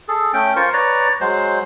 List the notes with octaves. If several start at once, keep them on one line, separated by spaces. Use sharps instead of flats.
G#4 A4
A3 C#4 G5
F4 A#4 C5 C#6
B4 C#5 D5 A#5
F#3 G#3 C5